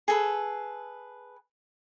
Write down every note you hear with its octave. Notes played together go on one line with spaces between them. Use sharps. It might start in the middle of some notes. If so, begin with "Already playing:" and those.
G#4 A4 B4